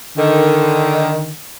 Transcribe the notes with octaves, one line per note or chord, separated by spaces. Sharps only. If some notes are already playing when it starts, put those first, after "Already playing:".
D3 D#3